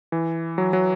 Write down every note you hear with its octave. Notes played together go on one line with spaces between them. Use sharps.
E3
F#3
F#3